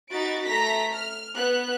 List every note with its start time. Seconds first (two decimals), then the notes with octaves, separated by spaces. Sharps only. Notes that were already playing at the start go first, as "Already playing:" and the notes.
0.11 D#4 F#4 B5 A6 D7
0.45 A3 A#5 A#6 B6
0.93 F6
1.34 B3 F#6